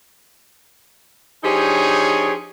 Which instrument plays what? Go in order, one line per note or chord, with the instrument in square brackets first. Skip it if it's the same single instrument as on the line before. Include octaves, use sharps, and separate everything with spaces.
[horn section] F3 D4 D#4 G4 G#4 C#5